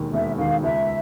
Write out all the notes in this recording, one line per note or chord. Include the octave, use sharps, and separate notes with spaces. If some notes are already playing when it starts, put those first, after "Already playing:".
Already playing: E1 D#2 D#3
E1 E5
D#2 D#3 F5
C#2 E5